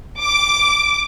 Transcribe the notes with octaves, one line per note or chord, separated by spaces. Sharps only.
D6